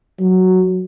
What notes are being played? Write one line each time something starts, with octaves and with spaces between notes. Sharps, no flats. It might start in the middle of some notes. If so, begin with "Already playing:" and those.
F#3